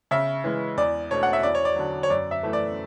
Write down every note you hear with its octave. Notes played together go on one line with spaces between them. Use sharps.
C#3 E5
E3 G#3
E2 D5
B2 A3 D4 C#5
F#5
E5
E2 D5
C#5
D5
D3 F#3
C#5
F#2 D5
E5
E3 A3
D5